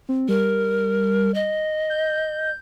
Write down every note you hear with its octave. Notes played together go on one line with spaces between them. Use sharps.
C4
G3 A#4
D#5
G6